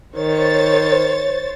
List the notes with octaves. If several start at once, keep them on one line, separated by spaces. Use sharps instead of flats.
D#3 C5 C#5 A6